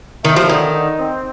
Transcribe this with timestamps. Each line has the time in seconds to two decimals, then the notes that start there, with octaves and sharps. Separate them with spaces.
0.24 D#3 A3
0.36 F3
0.49 D3 D#3
0.73 D#4
0.99 C4